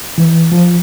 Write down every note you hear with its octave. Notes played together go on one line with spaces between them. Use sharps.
E3
F3